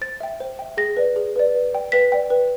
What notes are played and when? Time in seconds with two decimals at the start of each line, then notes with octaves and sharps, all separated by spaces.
0.01 C5 A6
0.21 E5 G5
0.40 C5
0.59 E5 G5
0.77 G#4 A#6
0.97 B4 D5
1.16 G#4
1.36 B4 D5
1.55 B4
1.73 D5 G5
1.92 B4 B6
2.12 D5 G5
2.30 B4